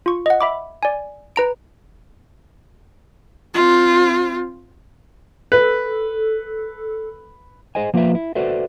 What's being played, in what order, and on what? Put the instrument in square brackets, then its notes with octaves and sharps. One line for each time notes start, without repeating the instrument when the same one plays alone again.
[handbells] F4 C#6
D#5 F#5
E5 B5 D6
D5 G#5
B4 A#5 D7
[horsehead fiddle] C4 F4
[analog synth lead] A4 [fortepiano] B4
[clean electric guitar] G#4 C5 D#5 G#5
F3 A#3 F4 B4 E5
E4
F#4 A4 B4 C5 D5 E5